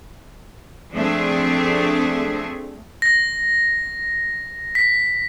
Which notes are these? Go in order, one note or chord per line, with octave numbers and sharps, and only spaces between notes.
F3 A3 C4 D4 G#4 E5
A#6
B6